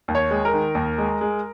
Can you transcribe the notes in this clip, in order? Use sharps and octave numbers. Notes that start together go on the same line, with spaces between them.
D#2
C#5
G#3
A#4
D#3
D#2
G#3
G#3